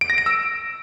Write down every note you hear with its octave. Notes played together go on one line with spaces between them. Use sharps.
D7
A#6
D7
E6